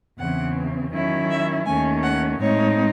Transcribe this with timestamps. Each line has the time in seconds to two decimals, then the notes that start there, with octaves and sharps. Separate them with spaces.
0.19 E2 C#3 E3 C4 F#5
0.93 D#3 F#3 C#4 E4
1.30 E5
1.66 D#2 D#3 A3 C#4 G#5
2.03 F#5
2.40 A2 G#3 C4 D#4 C#5